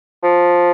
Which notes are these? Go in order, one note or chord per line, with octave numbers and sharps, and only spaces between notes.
F3